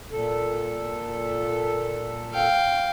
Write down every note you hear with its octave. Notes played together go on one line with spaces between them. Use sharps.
A#2 A4
F5 G5